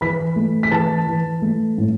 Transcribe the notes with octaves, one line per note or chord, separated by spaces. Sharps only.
E3 B5 B6
A3
B6
E3 A5 A6
E3
A3
A2